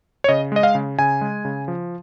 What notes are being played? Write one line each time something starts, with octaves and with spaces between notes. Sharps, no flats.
C#5
C#3 D#5
G#3 D#5
F5
C#3
C#3 G#5
G#3
C#3
F3